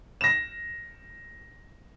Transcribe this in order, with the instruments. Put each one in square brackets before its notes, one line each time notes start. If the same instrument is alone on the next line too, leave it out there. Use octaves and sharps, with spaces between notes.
[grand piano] A#6 E7